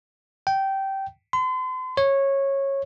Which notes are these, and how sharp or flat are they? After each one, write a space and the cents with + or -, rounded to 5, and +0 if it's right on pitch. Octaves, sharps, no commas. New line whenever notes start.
G5 -15
C6 -40
C#5 -15